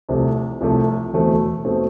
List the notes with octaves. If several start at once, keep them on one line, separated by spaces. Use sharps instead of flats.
C2 C3 F3 A3
C2 C3 F3 A3
E2 B2 A3 C4
B2 A3 C4